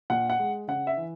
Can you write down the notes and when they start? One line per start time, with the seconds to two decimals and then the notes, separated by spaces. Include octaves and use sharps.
0.10 A#2 F#5
0.30 F#5
0.39 G#3
0.68 C#3 F#5
0.87 E5
0.97 E3